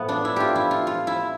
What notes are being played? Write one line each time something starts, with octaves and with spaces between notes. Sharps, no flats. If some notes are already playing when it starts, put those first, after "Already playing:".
Already playing: A2 F3 A3 B3
D4
E4
F4 G4
E4
F4
F4
E4